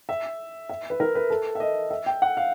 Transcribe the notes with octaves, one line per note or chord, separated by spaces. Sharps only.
E5
E5
B4
A#4
B4
A4
E5
D#5
E5
G5
F#5
F5